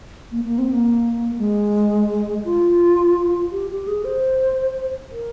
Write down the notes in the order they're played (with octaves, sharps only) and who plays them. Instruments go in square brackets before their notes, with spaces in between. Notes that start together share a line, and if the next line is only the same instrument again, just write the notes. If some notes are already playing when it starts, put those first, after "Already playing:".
[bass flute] A#3
A#3
C4
A#3
G#3
F4
G4
G4
G#4
C5
A#4